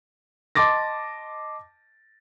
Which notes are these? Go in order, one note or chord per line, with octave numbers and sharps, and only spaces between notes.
D#5 A5 C6 D6 A6 A#6